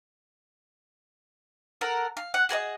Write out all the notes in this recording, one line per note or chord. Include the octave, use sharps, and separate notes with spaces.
A4 A#4 F#5
F5
F#5
F#4 G#4 B4 D#5